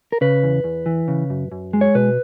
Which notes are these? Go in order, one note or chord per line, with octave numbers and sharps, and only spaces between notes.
A#4
C#3 B4
E2
E2
E3
C#3
F#2
F#2
G#3
C#5
B2 B4